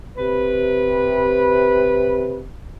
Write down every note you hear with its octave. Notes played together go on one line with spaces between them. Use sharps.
C3 B4